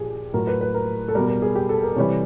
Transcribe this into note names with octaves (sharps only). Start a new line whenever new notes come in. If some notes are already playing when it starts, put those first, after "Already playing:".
Already playing: A#2 F3 G4 G#4
A2 F#3 A#4
B4
B4
A#4
A4
B2 G3 A#4
A#4
G#4
G4
A4
A#4
C3 E3 G3 C#5